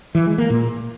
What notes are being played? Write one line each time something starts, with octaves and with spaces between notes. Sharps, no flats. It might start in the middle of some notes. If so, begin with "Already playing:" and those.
E3
G#3
A#3
A#2